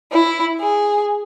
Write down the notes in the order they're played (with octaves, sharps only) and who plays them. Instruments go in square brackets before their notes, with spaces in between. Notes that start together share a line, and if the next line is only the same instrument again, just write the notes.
[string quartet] E4
G#4